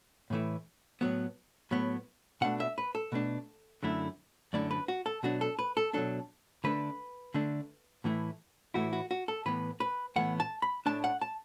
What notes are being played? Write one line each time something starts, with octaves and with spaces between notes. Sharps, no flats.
A2 E3 A3 E4
A2 F#3 B3
A2 F#3 B3
B2 A3 D4 F#5
E5
B4
A4
B2 A3 D4
F#2 D3 A3 E4
F#2 D3 A3 E4 D5
B4
F#4
A4
B2 F#3 D4 F#4
A4
B4
A4
B2 F#3 D4 A4
D3 A3 D4 B4
D3 A3 D4
A2 E3 A3 E4
A2 E3 A3 E4 F#4
F#4
F#4
A4
A2 E3 B3 B4
B4
A2 E3 B3 F#5
A5
B5
A2 A3 D4 A5
F#5
A5